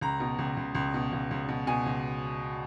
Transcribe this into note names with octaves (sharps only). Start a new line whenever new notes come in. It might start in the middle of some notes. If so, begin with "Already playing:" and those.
C#2 A#5
B2
C#2
C#2
C#2
B2
C#2
C#2
B2
B2 G#5
C#2